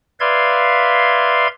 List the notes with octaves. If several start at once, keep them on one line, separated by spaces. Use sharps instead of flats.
B4 D5 E5 F5 C6 G#6